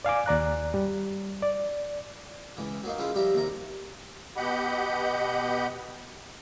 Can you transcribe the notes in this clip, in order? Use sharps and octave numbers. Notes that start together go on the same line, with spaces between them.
D5 F5 G#5 D6
D#2 D5 A#5 F#6
G3
D5
C#2 E3
F#3 A#3 D#4
C#3 F3 C#4 E4 F4
F3 G3 G4 E5 A#5
D#2 C3 A#5
B2 G4 D#5 F#5 B5 G6